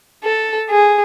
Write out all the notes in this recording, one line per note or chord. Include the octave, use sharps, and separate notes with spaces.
A4
G#4